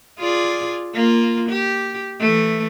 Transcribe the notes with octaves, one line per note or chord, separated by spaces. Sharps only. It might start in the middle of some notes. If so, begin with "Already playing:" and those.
F4 G#4 D5
A#3 F4
G4
E3 A3